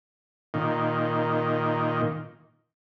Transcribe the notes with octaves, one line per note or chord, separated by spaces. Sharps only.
A#2 D#3